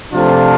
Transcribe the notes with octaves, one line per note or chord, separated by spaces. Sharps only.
C3 F3 A3 D4 F4